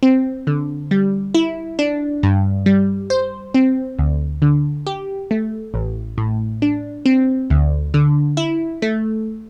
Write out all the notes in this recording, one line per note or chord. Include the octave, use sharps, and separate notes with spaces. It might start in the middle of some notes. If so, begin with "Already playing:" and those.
C4
D3
G3
E4
D4
G2
G3
C5
C4
D2
D3
G4
A3
A1
A2
D4
C4
D2
D3
E4
A3